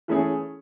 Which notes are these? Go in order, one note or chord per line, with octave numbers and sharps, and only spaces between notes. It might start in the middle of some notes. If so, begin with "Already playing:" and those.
E3 A3 C#4 G#4 C#5